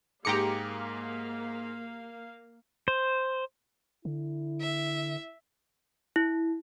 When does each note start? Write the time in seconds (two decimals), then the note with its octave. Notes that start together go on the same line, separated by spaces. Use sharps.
0.25 G#2 A#3 G4 G#4 F5 A#5 D6 C#7
2.88 C5
4.05 D3 E4
4.61 E5
6.16 E4